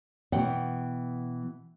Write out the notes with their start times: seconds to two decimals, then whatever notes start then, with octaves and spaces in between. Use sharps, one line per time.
0.32 B2 E3 F#5 G5